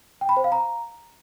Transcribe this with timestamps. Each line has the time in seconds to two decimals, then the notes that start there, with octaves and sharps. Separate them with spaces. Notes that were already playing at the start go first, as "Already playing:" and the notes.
0.21 G5
0.29 B5
0.37 C5
0.44 F5
0.52 A#5